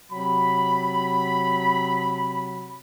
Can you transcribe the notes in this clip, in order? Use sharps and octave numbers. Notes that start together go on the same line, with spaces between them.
C3 F#3 B5